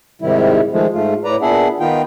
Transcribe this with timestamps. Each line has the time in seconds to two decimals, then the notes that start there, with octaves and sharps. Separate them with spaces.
0.22 G#2 C3 D#3 G3 E4
0.72 D#3 F3 G#3 A3
0.93 G#2 A3 F4
1.24 A2 B4 D5 A#5
1.42 A#2 B3 D4 G#4 E5 F#5
1.80 D#3 B3 D#4 F4 G5